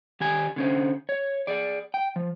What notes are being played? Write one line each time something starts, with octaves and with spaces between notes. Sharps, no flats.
D#3 G4 G#5
D3 C#4 C5
C#5
G#4 D5
G5
F3